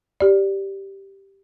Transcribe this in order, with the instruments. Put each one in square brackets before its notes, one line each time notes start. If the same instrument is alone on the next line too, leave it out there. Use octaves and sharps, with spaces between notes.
[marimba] G4 D5